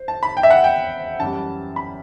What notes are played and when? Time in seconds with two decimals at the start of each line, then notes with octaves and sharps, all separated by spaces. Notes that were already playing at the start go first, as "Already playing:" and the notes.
Already playing: C5
0.08 A5
0.23 B5
0.37 G5
0.43 E5
0.51 F#5
0.64 G5
1.20 F#2 E3 G3 A5
1.76 B5